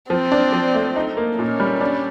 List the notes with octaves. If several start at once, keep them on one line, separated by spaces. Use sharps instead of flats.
F3 C4
D4
F3
A3
D#4
A#3
A#2 C#4
G3
D4